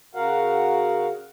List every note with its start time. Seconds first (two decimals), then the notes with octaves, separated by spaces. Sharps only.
0.15 C#3 F#4 A#4 F5 F#5